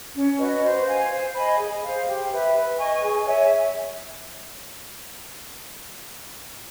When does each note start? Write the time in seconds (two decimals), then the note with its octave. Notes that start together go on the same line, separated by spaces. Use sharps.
0.15 C#4
0.38 F#4 B4 D#5
0.62 C5
0.86 F5 G#5
1.11 C5
1.35 D#5 G#5 B5
1.59 G#4
1.83 C5 F5
2.06 G4
2.31 B4 E5
2.54 B4
2.78 D#5 G#5 C#6
3.02 G#4
3.26 C#5 E5 G#5